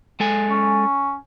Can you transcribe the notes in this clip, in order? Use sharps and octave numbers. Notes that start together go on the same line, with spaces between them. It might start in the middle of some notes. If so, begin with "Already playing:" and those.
G#3 A4 G#5
C#4